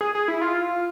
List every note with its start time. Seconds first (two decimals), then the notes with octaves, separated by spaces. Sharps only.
0.01 G#4
0.15 G#4
0.28 E4
0.41 F4